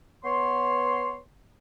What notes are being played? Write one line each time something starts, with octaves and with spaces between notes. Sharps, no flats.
B3 C#5 C6